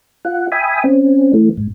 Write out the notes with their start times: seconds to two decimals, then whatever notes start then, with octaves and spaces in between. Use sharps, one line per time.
0.25 F4 F#5
0.52 E5 G5 G#5 B5 D#6
0.84 C4 C#4
1.33 E3 A3
1.57 G#2